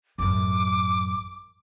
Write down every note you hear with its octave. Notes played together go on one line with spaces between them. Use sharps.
A1 F#2 D6